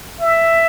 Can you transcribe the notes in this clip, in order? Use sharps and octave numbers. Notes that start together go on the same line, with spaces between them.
E5